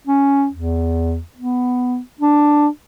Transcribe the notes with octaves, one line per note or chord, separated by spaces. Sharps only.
C#4
E2
B3
D4